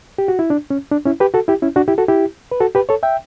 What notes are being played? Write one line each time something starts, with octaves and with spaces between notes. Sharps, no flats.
G4
F#4
E4
D4
C#4
D4
C#4 E4
G4 B4
F#4 A4
E4 G4
C#4 E4
D4 F#4
E4 G4
F#4 A4
E4 G4
B4
F#4 A4
G4 B4
A4 C#5
E5 G5